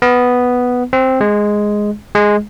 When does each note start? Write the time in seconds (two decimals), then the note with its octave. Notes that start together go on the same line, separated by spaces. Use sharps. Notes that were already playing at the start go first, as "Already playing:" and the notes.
0.02 B3
0.93 C4
1.21 G#3
2.15 G#3